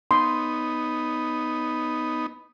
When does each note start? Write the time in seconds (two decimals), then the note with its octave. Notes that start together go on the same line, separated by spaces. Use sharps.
0.11 B3 D#4 C6